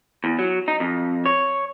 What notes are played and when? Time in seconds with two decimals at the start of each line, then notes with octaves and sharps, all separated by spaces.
0.24 E2
0.39 F#3
0.68 D#4
0.80 F2
1.26 C#5